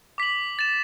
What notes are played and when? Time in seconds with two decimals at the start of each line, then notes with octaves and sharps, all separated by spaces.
0.18 D6 B6 F#7
0.59 A6 E7